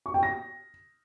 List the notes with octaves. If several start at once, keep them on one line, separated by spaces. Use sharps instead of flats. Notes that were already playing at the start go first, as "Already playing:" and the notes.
C#6
G5
A#6